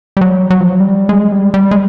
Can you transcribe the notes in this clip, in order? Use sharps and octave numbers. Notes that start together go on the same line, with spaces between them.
G3
F#3
F#3
F3
F#3
G3
G#3
G3
G3
G#3